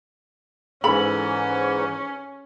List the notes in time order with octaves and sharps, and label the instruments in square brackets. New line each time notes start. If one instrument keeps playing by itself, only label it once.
[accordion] G#2 E3 [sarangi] C#4 [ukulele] A4 B5